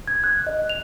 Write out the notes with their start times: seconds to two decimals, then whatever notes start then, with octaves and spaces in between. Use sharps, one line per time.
0.08 G#6
0.24 F#6
0.47 D#5
0.70 F7